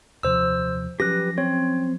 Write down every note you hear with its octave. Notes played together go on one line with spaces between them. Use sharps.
D#2 C3 F3 C5 E6
F3 F#3 C#4 G4 B4 F#6 A#6
C4 C#5